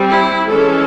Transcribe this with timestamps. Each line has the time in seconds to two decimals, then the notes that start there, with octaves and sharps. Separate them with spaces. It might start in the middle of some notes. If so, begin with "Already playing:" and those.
Already playing: G3 C4
0.11 E4
0.49 E3 G#3 C#4 A4